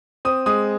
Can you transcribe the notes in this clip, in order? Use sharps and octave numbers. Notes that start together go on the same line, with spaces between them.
C4 D#6
G#3 D#6